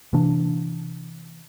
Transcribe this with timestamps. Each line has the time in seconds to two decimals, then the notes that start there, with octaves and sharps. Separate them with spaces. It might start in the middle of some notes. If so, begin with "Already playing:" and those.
0.13 C3 E3 A#3 D4